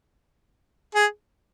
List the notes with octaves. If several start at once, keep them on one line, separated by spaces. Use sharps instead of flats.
G#4